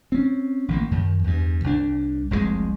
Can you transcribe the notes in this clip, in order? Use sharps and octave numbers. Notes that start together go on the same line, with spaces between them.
C4 C#4
A1 D#3 G#3 A#3
F#2 D#3
E2 G2
C2 D4
F1 C2 G#2 G#3